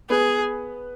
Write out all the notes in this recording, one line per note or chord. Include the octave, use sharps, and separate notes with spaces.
B3 G#4 B4